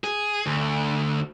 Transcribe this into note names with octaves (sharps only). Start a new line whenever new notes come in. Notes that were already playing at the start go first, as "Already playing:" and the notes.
G#4
D2